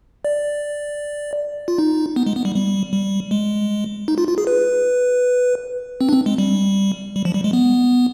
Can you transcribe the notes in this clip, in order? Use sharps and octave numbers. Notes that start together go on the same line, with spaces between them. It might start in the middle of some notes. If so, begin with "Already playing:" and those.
D5
F4
D#4
B3
G#3
B3
G3
G3
G3
G#3
D#4
F4
F4
G#4
B4
C4
D4
C4
G#3
G3
G3
F3
G3
G#3
B3